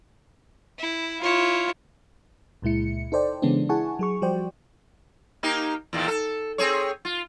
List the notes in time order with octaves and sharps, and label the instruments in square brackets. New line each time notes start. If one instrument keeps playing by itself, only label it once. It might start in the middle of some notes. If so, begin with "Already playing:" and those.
[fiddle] E4
[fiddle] E4 C#5 [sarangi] F4
[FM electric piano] C#2 A#2 G#3 E4 C#7
D#4 A4 C5 D5 G5
C#3 E3 G#3 B3 C#4 D4
E4 G#4 F#5 G#5 A5 C#6
F#3 G#4 C#6
F3 G3 F#4 C5 D5 G5
[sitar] A#3 D#4 G4
E2 A#2 D#3
A4
C4 G#4 C#5
F4